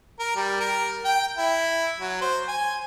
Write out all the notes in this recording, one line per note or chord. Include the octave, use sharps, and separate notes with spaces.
A#4
G3
A#4
G5
E4
F#3
C5
G#5